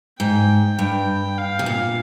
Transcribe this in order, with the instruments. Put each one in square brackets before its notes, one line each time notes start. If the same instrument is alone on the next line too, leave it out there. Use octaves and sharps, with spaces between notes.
[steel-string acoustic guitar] G#2 [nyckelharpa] G5
[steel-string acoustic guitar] G2 [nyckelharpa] G5
[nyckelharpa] F5
[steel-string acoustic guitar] C3
A#2